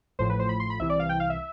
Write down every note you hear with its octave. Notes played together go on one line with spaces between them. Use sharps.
A1 A2 F3 C5
B4
C5
B5
C6
B5
C2 C3 E3 E5
D5
F5
G5
F5
E5